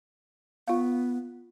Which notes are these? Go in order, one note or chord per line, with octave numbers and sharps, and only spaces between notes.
B3 F4 F5